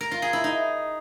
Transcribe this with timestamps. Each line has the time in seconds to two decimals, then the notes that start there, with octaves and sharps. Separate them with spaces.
0.01 A#4
0.11 F4
0.22 G#4
0.33 E4
0.44 D#4